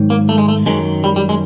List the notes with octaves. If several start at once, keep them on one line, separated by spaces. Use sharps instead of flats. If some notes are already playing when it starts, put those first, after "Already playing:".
Already playing: G#2 D#3 F#3
A#3
A3
G#3
A3
F#2 D#3 F#3 G#3
G3
G3
G#3